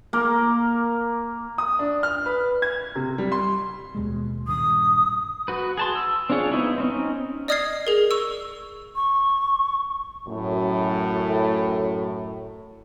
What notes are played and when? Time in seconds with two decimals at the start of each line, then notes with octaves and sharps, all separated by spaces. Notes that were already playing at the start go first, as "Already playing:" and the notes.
0.13 A#3 A#4
1.58 D#6
1.79 D4
2.03 F6
2.26 B4
2.62 G#6
2.96 C3
3.18 G3
3.32 C6
3.95 D#2 B2 G#3
4.48 G2 A#2 D#3 D#6
5.48 F#4 B4
5.77 G#4 A5 C6
5.95 E6
6.30 C4 D4 F4 G#4 C#5
6.52 B3 C4 D#4 E4
6.78 C4 C#4 D#4
7.48 D5 D#5 D#6 F6 G#6 C7
7.87 G#4 A#4
8.11 C#6 E6
8.96 C#6
10.27 F#2 A2